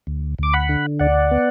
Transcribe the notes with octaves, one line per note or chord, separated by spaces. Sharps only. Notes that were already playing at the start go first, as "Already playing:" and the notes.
D2
D2 D6
F#5 B5
D3
D2 D5 F#5
B3